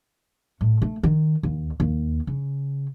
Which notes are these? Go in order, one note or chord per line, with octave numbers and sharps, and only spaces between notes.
A2
A3
D#3
D#2
D#2
C#3